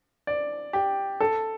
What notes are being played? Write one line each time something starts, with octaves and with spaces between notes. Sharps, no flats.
D5
G4
A4